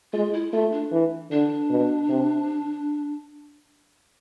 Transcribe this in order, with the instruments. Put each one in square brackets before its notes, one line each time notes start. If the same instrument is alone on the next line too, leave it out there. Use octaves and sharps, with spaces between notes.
[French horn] G#3 [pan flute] F4
[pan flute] E4
[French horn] A3 [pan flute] F4
[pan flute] D4
[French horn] E3
[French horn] D3 [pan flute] D4
[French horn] B2
C3